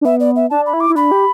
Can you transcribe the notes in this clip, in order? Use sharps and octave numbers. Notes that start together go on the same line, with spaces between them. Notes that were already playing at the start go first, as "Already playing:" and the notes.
D4
B3 E5
D5
E5
D4 A5
B5
E4
D6
E4
D4 B5
G4